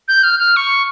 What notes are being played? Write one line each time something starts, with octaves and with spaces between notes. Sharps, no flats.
G6
F6
F6
C#6